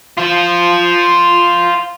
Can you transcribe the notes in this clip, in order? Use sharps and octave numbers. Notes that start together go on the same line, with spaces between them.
F4 C5